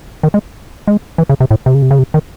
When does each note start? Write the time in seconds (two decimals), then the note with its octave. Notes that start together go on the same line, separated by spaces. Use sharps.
0.23 D#3
0.34 G#3
0.87 G#3
1.18 E3
1.29 C#3
1.40 C3
1.51 A2
1.66 C3
1.75 C#3
1.82 C3
1.91 C#3
1.99 C3
2.14 D#3